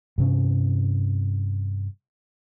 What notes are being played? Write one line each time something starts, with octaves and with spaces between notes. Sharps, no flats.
G2 C3 C#4